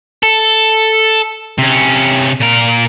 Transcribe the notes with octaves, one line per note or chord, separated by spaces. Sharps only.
A4
C3 C#4
A#2 A#4